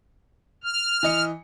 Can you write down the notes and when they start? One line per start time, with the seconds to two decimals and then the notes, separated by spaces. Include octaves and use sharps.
0.63 F6
1.03 E3 D#5 C#7